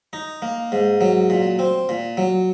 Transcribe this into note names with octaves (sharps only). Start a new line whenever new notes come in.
D#4
A#3
G#2
F#3
A#2
C4
A#2
F#3